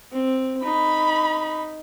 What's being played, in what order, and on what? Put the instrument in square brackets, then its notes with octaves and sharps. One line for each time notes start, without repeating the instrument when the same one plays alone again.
[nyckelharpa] C4
[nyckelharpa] D#4 [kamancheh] B5